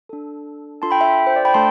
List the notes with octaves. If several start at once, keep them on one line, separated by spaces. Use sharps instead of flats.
D4 A4
D4 F4 A4 A5 C6
G5 B5
E5 G5
C5
D5
G5 B5
A3 D4 A4 A5 C6